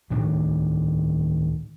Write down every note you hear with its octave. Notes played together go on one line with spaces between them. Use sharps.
D2 A2 D#3 D4